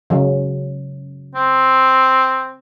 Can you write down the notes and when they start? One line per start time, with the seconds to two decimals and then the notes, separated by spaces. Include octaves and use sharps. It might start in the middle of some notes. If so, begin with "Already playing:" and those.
0.10 C#3 F#3
1.35 C4